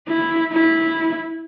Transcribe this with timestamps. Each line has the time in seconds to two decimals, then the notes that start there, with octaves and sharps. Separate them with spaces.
0.08 E4
0.53 E4